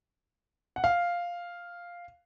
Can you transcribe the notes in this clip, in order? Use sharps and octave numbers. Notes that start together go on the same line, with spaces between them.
F#5
F5